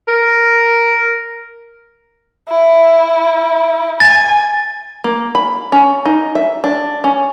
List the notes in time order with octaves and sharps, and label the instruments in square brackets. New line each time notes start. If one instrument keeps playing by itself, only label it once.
[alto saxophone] A#4
[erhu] E4
[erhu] G#5 [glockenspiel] A6
[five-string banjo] A#3
B5
C#4
D#4
E5
D4
C#4